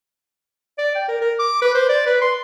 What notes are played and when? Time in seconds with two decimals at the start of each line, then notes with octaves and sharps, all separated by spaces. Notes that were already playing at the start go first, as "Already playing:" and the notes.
0.78 D5
0.95 G5
1.09 A#4
1.21 A#4
1.39 D6
1.62 B4
1.75 C5
1.89 D5
2.07 B4
2.22 C6